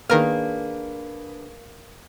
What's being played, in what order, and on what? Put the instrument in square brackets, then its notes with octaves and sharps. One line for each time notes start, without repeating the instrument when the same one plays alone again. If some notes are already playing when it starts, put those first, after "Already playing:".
[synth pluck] D#3 A#4 F6 [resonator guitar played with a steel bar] A#3 [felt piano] D4 G#4 B4